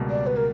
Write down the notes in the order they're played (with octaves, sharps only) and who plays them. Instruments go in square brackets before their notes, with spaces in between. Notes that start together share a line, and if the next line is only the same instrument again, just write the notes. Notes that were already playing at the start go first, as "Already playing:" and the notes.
Already playing: [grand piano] C#2 B2 G3 A#3
[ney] D5
B4
A#4